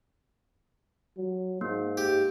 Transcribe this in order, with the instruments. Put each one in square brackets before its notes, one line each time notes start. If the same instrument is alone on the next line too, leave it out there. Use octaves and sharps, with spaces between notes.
[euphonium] F#3
[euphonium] G#2 [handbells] A#3
[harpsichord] G4